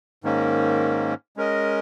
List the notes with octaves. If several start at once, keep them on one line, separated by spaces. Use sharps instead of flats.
G#2 D#3 A#3 C#4
G#3 C#4 A#4 D#5